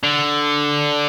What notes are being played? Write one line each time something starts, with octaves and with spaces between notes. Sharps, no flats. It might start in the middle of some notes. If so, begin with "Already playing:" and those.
D3